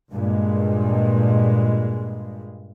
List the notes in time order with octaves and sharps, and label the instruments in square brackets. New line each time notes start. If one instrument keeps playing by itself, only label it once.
[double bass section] G2 A#2 G#3